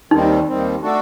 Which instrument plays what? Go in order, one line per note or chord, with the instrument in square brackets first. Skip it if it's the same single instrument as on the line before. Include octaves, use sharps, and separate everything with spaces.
[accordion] D#2 D#3 G3 C4 [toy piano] D#4
[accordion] D#2 D#3 G3 C4
A3 D4 F#4 A4